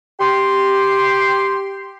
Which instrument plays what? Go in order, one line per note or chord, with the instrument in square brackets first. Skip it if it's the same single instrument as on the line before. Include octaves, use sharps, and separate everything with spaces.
[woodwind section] G4 C6